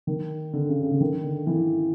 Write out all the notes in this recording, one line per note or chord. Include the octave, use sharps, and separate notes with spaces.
D#3
D3
C#3
C#3
D3
D#3
D3
E3